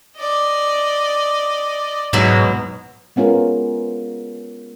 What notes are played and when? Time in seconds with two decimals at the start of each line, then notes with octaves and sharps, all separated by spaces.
0.18 D5 D#5
2.13 G#2 B2 F#3 E4
3.16 G#3 B3 C#4 F4 A#4